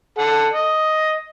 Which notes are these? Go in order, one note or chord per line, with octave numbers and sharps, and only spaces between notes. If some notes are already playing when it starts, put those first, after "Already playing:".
A4 F#5
D#5